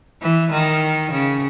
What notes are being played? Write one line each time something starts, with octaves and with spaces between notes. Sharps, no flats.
E3
D#3
C#3